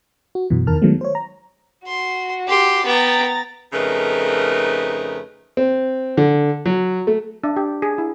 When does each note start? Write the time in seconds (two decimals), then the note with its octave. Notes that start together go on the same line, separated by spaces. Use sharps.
0.35 F#4
0.50 F#2 B2 E3
0.67 E2 D#3 A#4 A5 F6
0.82 D#3 F#3 G#3 A3 B3
1.01 C5 C#5
1.15 A#5
1.88 F#4 C6
2.48 G4 C6
2.86 B3 G5 A#5 A6
3.73 F2 C#3 A3 D#4 A#4 B4
5.57 C4
6.17 D3
6.66 F#3
7.07 A3
7.44 D4
7.56 G4
7.82 G#4
7.98 E4